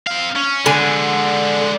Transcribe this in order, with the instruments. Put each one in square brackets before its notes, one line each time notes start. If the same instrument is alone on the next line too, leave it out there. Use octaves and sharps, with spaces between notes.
[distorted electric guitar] C4 F5
C#4
[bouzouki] D3 G#5 [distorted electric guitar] G#3 D4